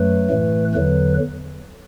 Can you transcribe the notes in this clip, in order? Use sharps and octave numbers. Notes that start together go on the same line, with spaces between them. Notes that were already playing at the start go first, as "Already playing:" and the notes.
Already playing: F#2 F#3 A3 B4
A2 E3 A3
E2 D3 F#3 B4